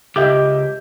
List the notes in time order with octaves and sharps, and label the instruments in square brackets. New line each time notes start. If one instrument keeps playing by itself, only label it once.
[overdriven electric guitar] C#2 [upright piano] G4 [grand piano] D#5 E5 G6 [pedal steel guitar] D6